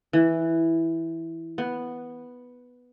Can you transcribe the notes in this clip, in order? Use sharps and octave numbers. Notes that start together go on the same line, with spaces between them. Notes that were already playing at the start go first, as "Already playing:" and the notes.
E3
B3